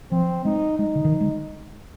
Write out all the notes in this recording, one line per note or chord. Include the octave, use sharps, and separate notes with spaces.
F3 C4
G#3 D#4
G#3 D#4
D3
D#3
F3
G#3